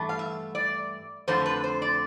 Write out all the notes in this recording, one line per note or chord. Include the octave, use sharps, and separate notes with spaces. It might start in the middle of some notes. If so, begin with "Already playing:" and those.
Already playing: G2 E3 A3
F5
E5
D5
F2 D3 A3 C5
B4
C5
D5